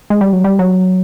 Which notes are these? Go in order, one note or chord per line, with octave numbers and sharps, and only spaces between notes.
G#3
G3
F#3
G3
F#3